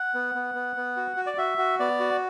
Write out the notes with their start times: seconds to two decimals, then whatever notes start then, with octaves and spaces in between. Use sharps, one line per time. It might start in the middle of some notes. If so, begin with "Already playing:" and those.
Already playing: F#5
0.14 B3
0.35 B3
0.55 B3
0.76 B3
0.96 F#4
1.17 F#4
1.26 D5
1.37 F#4 E5
1.58 F#4
1.79 B3 D5
2.00 F#4